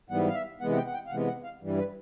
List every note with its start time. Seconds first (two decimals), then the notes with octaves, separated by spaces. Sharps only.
0.10 G#2 E3 G3 B3 F#5
0.28 F5
0.35 E5
0.61 C3 E3 G#3 B3 F#5
0.72 F#5
0.77 G5
0.87 F#5
0.94 G5
1.07 F5
1.10 C3 E3 G#3 B3 F#5
1.27 F#5
1.44 F5
1.62 G2 E3 G3
1.78 B4